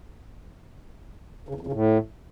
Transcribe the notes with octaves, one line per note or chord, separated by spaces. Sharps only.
C#3
E2
F2
C#3
A2